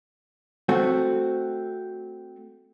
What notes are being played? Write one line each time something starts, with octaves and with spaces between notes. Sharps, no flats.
A3 C4 F#4